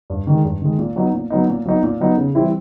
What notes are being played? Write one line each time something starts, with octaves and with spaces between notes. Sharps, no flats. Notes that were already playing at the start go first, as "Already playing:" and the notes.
G2
D#3 G#3
G2
D#3 G#3
A#2
F#3 B3 D#4
A#2
F#3 B3 D#4
A#2
F#3 B3 D#4
A#2
F#3 B3 D#4
C#3
E3 G3 C4 E4